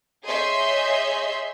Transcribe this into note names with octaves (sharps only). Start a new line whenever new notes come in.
G#4 C#5 D#5 E5 C6 G6